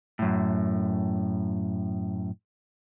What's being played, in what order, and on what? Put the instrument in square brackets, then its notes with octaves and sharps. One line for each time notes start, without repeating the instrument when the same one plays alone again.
[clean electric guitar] F#2 A2